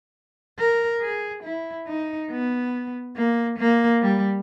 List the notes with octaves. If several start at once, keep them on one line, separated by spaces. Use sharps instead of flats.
A#4
G#4
E4
D#4
B3
A#3
A#3
G3